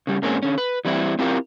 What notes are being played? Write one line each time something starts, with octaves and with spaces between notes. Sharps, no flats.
C#3 G3
G#2 A#3 C4 C#4 G#4
D3 C#4
B4
E3 G3 C4 E4
C4 E4 F4 G4 A#4